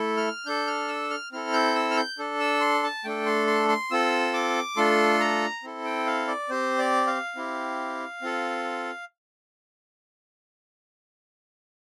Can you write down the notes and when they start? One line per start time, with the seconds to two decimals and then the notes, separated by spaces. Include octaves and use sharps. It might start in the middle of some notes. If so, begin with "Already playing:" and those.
Already playing: A3 E4 A4
0.17 F6
0.46 D4 A4 G6
0.67 F6
0.88 E6
1.10 F6
1.32 C4 E4 A4 F6
1.53 G6
1.75 E6
1.91 F6
1.97 G6
2.18 D4 A4
2.40 E6
2.61 C6
2.83 A5
3.04 A3 D4 A4 G5
3.26 C6
3.47 C6
3.69 C6
3.91 C4 F4 A4 E6
4.34 D6
4.77 A3 D4 F4 A4 C6
5.20 A#5
5.63 C4 E4 A4
5.85 G5
6.06 F5
6.28 D5
6.49 C4 G4 C5
6.78 D5
7.07 F5
7.36 C4 E4 G4
8.22 C4 F4 A4